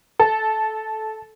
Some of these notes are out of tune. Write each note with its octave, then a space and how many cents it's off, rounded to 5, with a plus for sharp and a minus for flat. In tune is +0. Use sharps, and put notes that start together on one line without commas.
A4 -15